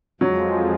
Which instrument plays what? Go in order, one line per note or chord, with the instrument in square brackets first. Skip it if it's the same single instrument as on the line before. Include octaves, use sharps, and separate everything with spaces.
[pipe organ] F2 F3 G#3 [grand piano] F#3